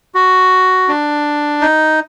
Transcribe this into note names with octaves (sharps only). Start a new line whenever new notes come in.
F#4
D4
D#4